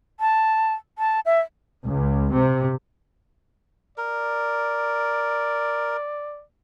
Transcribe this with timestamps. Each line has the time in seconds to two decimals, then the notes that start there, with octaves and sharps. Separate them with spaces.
0.20 A5
0.98 A5
1.26 E5
1.85 C#2
2.33 C3
3.98 A#4 D5